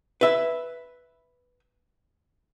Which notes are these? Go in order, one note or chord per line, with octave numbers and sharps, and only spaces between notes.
B4 E5